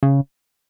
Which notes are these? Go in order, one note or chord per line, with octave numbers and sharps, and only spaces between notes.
C#3